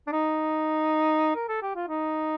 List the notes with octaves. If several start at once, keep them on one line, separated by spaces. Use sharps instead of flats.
D4
D#4
A#4
A4
G4
F4
D#4